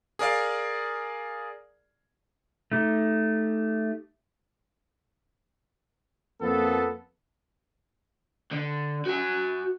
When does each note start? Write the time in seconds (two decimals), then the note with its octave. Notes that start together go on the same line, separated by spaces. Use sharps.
0.19 G#4 A#4 D5 F5
2.72 A3 D#4 G4
6.41 F2 A#3 B3 A4
8.51 D3
9.06 F#4 G#5